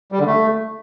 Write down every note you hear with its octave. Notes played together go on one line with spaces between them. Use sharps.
G3
D3
A3